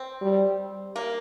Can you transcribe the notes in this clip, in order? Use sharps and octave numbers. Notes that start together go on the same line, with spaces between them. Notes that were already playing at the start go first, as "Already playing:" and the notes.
Already playing: C4
G3
A#3